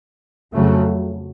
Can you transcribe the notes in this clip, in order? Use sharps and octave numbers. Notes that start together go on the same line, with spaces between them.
F2 C#3 F#3 A3